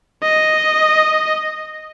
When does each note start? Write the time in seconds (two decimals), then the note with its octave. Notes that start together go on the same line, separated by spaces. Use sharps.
0.23 D#5